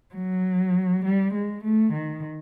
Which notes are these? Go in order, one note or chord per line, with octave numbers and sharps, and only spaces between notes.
F#3
G3
G#3
A3
D#3